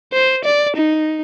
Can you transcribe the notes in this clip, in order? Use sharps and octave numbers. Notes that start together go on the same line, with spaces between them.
C5
D5
D#4